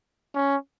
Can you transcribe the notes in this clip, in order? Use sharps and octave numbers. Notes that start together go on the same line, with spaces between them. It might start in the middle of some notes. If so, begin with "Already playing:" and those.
C#4